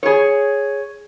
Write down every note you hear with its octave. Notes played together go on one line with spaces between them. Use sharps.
G#4 C#5